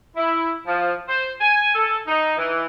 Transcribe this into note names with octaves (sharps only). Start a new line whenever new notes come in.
E4
F3
C5
G#5
A4
D#4
E3